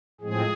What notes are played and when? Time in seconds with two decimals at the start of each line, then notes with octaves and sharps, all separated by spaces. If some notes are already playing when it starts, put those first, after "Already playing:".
0.21 A2 F3 G#3 C4 G#4